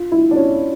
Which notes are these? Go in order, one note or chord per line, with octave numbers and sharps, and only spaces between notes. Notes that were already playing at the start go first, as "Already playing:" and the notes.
Already playing: F4
E4
D4
C#4